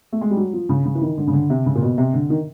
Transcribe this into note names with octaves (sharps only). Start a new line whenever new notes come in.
A3
G#3
G3
F#3
F3
C#3
C#3
E3
D#3
D3
C#3
D3
C3
C#3
A#2
B2
C3
D3
D#3